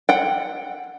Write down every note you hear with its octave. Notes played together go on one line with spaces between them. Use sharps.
F#5 G5